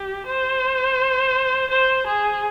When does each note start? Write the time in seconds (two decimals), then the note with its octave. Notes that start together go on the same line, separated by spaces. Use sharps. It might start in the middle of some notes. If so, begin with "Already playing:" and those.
Already playing: G4
0.26 C5
1.70 C5
2.07 G#4